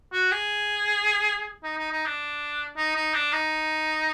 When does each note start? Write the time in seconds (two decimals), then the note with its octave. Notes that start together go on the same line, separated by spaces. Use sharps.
0.13 F#4
0.32 G#4
1.64 D#4
1.78 D#4
1.92 D#4
2.06 D4
2.77 D#4
2.96 D#4
3.14 D4
3.33 D#4